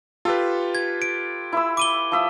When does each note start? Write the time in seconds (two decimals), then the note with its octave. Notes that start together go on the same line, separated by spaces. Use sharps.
0.25 F4 G4 A4 B4
0.75 G#6
1.02 D7
1.52 E4 B5 E6
1.77 D6 D#7 G7
2.12 F3 E5 D#6